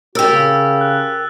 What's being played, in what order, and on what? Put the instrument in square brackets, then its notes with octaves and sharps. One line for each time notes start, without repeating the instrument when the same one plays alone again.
[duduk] F#4 [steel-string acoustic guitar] G4 A#4 [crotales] E6 A6
[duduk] C#3
[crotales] F#6